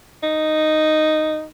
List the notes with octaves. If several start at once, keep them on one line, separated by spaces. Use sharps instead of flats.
D#4